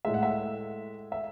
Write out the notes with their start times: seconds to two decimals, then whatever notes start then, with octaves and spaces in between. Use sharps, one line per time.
0.05 A2 G#3 E5
0.14 F#5
0.23 E5
1.12 E5